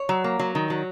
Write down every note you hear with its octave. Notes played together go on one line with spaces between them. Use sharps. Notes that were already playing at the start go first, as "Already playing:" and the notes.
Already playing: C#5
F#3
A#3
F#3
D#3
F#3